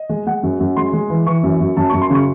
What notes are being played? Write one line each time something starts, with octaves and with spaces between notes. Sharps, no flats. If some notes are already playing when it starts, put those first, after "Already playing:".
Already playing: D#5
G#3
G#3 F#5
F#2
F#2
G#3 C6
G#3
E3
E3 C#6
F#2
F#2
F#2 A5
F#2 C#6
C6
C#3 C#6